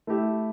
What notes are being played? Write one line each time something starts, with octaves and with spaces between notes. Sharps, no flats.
A3 E4 G4 E5